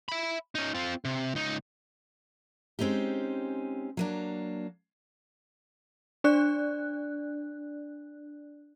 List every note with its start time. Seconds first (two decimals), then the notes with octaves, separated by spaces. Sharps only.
0.09 E5 B5
0.55 C#4 D#4
0.75 C4 F4
1.05 C3
1.35 C#2 D#4
2.79 G#3 C4 C#4 D#4 G4
3.97 F#3 A#3 D4
6.24 D4 D5 F#6